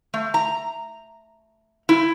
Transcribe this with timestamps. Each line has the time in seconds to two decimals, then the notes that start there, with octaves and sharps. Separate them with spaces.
0.14 A3
0.34 A#5
1.89 E4